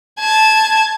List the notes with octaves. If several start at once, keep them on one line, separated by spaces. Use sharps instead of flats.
A5 G#6